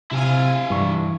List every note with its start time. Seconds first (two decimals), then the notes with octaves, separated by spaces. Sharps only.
0.11 C3 E4 F5 G#5
0.70 G2 E3 C#6